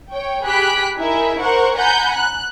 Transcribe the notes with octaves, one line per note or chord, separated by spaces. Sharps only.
C#5 G5
G4 G#4 B5 F#6 B6 D7
D#4 E4 G#4 A#4 E5
A#4 C5 F#5 C#6
F#5 G#5 A#5 B5 G6
F#6